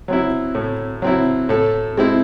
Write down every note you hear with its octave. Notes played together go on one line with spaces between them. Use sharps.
F#3 C4 E4
A2
F#3 C4 E4
A2 A4
G#3 C4 E4